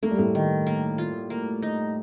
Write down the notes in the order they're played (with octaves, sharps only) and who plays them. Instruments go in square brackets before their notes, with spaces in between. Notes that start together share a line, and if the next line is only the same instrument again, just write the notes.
[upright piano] A3 [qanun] A#3
[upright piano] G3
A2 A3
[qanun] D#3
A#3
F4
A#3
D#4